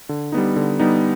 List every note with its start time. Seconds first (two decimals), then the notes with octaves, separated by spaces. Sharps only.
0.09 D3
0.32 G3 B3 D#4
0.56 D3
0.79 G3 B3 D#4